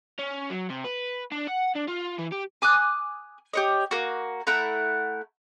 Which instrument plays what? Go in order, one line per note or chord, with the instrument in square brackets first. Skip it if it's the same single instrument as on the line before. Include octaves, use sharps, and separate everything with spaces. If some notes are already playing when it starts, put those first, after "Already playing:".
[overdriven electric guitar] C#4
F#3
C3
B4
D4
F#5
D4
F4
E3
G4
[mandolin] G#5 D6 D#6 F#6
G4 C#5 D#5
A#3 F#4
A3 E4 F#5 A#5